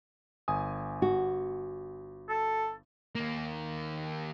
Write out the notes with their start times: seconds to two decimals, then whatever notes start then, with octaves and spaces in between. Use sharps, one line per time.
0.48 G1 G#5 D#6
1.02 F#4
2.29 A4
3.15 D#3 A#3